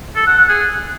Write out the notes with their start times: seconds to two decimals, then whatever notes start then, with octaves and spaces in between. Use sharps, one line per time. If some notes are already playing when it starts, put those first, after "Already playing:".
0.16 A4
0.27 F#5
0.38 F#5
0.48 G#4